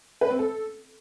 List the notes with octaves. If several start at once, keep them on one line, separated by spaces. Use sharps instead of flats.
B4
C4
A4